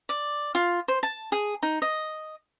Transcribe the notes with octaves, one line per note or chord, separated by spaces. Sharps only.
D5
F4
C5
A5
G#4
D#4
D#5